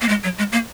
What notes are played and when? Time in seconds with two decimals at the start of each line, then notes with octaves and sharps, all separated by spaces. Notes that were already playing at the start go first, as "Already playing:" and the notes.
0.01 A#3
0.09 G#3
0.24 F#3
0.38 G#3
0.52 A#3